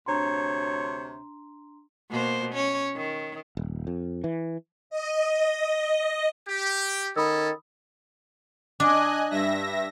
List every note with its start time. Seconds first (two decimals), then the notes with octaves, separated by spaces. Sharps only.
0.06 D2 C3 D4 C#5 A#5 C6
2.11 B2 A#3 C5
2.54 C#4 C#5
2.96 D#3
3.57 D#1
3.87 F2
4.24 E3
4.90 D#5
6.49 G4
7.16 D#3 C#4 A4 B5 D#6 E6
8.80 D4 D#5 G#5 F#6
9.30 G2 E5 A#6